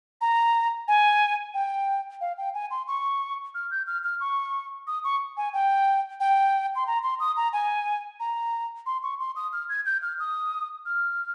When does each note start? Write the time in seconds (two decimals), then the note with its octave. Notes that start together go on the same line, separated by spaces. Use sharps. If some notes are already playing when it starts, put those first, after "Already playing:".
0.21 A#5
0.88 G#5
1.54 G5
2.21 F5
2.38 G5
2.54 G#5
2.71 C6
2.87 C#6
3.55 F6
3.71 G6
3.87 F6
4.04 F6
4.20 C#6
4.87 D#6
5.04 C#6
5.37 G#5
5.53 G5
6.20 G5
6.76 C6
6.87 A#5
7.03 C6
7.20 D#6
7.37 A#5
7.53 G#5
8.20 A#5
8.86 C6
9.03 C#6
9.20 C6
9.36 D#6
9.53 F6
9.69 G#6
9.86 G6
10.02 F6
10.19 D#6
10.86 F6